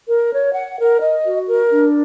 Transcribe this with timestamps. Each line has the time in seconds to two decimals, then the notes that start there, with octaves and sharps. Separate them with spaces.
0.08 A#4
0.31 C#5
0.54 F#5
0.78 A#4
1.01 D#5
1.24 F#4
1.48 A#4
1.71 D4